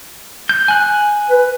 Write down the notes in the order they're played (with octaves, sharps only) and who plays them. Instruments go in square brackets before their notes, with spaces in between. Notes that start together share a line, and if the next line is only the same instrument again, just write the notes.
[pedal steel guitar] G6
G#5 F#6
[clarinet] B4